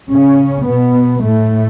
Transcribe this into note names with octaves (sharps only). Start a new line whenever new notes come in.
C#3 C#4
B2 B3
A2 A3